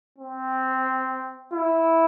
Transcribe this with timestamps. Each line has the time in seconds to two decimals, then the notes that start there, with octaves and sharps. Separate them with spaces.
0.18 C4
1.53 E4